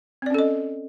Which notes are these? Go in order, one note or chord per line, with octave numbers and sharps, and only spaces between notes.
C4 C#4 A4 D5 D#5